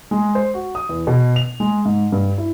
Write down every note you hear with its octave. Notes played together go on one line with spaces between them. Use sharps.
G#3
C5
F#4
D#6
E2
B2
F7
G#3
G#2
G2
E4